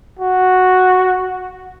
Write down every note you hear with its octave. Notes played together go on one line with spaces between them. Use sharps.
F#4